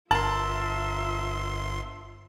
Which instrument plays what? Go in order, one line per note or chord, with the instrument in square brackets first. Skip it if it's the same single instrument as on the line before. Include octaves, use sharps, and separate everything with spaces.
[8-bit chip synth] G1 C6 [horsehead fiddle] F4 E5 [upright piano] A#4 A5 F#7